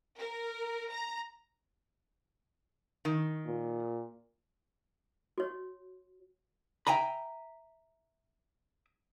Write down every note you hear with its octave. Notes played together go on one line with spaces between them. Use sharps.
A#4
A#5
D#3
A#2
F#4 C#5
E5 G5 G#5 A#5 B5